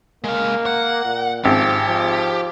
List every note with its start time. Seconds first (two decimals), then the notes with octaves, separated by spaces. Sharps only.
0.24 G#3 A#3 F5
0.66 F#5
1.05 A#2
1.45 G#1 F3 G4
1.89 F3